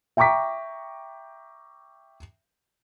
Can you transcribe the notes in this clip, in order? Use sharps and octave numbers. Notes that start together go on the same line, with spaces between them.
E5 G5 A#5 C#6 D6 B6